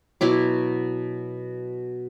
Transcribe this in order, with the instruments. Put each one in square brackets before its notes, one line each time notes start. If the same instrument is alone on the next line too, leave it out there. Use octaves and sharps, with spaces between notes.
[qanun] B2 F#3 E4 D6